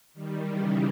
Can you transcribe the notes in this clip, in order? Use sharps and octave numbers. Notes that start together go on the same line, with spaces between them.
D#3 G3
C#3 E3